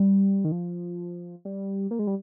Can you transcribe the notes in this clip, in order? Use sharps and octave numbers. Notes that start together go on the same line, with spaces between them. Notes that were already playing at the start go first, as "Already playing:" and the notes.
Already playing: G3
D#3
F3
G3
A#3
G#3
G3